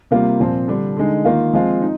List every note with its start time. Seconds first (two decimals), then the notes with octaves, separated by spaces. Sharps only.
0.11 C3 G3 A#3 F4
0.40 A#2 F3 C4
0.68 D3 G3 D4
0.97 D3 G#3 D#4
1.25 D#3 A#3 F4
1.53 F3 G#3 C4 F4
1.82 D#4